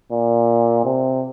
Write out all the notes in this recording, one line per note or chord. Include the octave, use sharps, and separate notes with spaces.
A#2
C3